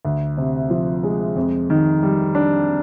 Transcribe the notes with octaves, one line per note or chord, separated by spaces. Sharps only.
D2
C3
F3
G#3
F2
D#3
G3
D4